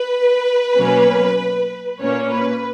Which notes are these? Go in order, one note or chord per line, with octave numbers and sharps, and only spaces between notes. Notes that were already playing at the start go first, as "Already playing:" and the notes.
Already playing: B4
B2 F#3 A#3 C#4
A#2 A#3 C#4 C#5
B4